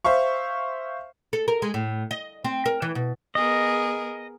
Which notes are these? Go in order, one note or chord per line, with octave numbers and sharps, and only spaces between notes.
C5 E5 F5 C#6
A4
A#4
G#3
A2
D#5
C4
A#4
E3
B2
B3 G#4 A#4 D#5